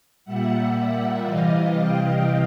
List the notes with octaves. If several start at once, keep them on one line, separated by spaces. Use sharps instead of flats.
A#2 G3 E5 F#5
E5 F#5
C3 E3 G3 D#5 F5
F5 G5